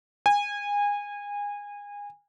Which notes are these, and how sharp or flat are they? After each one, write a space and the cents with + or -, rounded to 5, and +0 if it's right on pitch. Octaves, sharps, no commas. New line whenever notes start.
G#5 -25